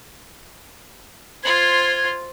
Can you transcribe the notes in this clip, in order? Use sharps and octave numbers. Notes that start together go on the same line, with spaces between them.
F4 C5 G#6